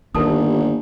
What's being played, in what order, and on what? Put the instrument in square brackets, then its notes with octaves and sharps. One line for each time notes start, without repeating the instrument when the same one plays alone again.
[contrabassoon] G1 [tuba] D#2 [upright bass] A#3 [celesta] A#4 A5 D#6